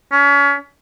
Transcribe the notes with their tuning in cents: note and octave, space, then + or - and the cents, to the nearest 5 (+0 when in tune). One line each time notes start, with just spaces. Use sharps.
C#4 +35